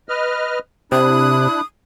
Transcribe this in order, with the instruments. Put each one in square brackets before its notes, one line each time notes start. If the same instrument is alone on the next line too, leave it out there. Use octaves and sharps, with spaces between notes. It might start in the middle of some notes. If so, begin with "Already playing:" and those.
[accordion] B4 D#5 F6
[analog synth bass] C3 [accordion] D4 E4 F#6 [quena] D#6